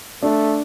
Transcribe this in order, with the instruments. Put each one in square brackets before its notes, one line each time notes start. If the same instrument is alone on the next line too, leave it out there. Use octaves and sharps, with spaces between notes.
[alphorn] A3 [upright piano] D4